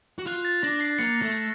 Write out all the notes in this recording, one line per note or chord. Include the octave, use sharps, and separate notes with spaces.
F#4
F4 F#6
A6
D4 A#6
C7
A#3 C#7
A3